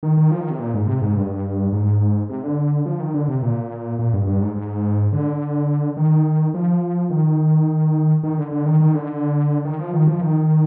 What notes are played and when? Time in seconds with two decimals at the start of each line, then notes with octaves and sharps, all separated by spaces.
0.03 D#3
0.17 D#3
0.31 F3
0.41 D#3
0.50 C3
0.59 A#2
0.74 G#2
0.87 C3
1.02 G#2
1.17 G2
1.72 G#2
2.29 C3
2.43 D3
2.86 F3
3.00 D#3
3.14 D3
3.28 C3
3.43 A#2
3.99 A#2
4.13 G2
4.27 G2
4.41 G#2
4.56 G#2
5.12 D3
5.97 D#3
6.54 F3
7.10 D#3
8.23 D#3
8.38 D3
8.52 D3
8.66 D#3
8.80 D#3
8.94 D3
9.65 D#3
9.79 F3
9.94 D#3
10.07 F3
10.21 D#3